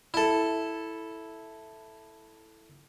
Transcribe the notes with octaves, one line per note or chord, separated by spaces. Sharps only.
E4 A4